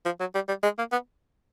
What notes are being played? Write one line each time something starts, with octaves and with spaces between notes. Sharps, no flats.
F3
F#3
G3
G3
G#3
A#3
B3